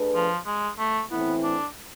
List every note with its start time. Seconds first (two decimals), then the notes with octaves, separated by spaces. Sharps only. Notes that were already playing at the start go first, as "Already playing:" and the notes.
Already playing: A3 D4 G#4 B4
0.15 F3
0.46 G#3
0.79 A3
1.11 A2 E3 A3 B3 C4 E4
1.43 D4